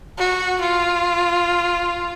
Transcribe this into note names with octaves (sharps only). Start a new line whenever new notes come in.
F#4
F4